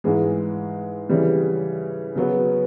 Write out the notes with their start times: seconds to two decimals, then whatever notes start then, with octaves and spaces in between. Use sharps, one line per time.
0.04 G#2 E3 G#3
1.09 C#3 E3 G3
2.16 C#3 F#3 B3